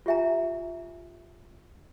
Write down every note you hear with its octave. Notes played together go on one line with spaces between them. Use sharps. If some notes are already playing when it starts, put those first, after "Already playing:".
F4 G4 E5 G#5 A#5